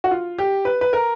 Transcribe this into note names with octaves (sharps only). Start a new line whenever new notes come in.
F#4
F4
G4
B4
B4
A#4